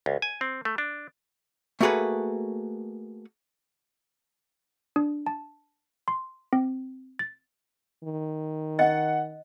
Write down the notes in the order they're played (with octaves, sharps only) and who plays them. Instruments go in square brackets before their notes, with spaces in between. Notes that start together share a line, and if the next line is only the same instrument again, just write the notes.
[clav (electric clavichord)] C#2
G#5
C4
A3
D4
[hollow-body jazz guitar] A3 A#3 F#4 G#4 A4 B4
[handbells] D4
A5
C6
C4
A6
[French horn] D#3
[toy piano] D#5 [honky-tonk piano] F#5